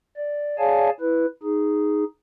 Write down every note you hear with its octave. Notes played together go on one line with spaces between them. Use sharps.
D5
G#4 C#5 D5 F5 G#5 A5
E4 B4
D#4 G#4